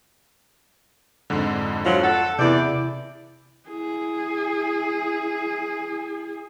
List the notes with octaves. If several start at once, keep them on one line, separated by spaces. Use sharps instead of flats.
F2 G#2 D3
C3 F3 F#3
A4 F#5
E2 C3 E4 D5 G6
E4 G#4